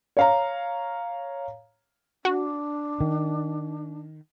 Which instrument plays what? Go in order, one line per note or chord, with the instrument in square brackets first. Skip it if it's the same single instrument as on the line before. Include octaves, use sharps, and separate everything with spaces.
[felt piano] C#5 F5 A#5
[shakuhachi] D4 [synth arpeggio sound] F#4
[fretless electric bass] D#3